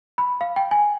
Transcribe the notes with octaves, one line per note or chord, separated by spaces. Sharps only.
B5
F5
G5
G#5